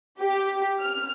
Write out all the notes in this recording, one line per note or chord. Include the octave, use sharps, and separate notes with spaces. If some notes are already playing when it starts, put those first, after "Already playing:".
G4
F6